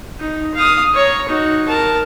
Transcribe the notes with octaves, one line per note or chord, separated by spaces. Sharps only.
D#4
F5 D#6
C#5 A#5
D#4 F#4
A#4 A5